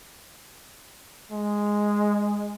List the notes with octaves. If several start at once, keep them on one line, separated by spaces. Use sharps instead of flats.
G#3